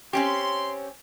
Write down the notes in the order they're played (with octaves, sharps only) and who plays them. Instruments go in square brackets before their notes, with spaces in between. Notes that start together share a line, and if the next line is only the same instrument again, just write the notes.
[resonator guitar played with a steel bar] C4 C#4 G4 [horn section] C6